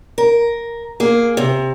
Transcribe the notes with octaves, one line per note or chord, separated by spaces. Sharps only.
A#4
A#3 G#4
C3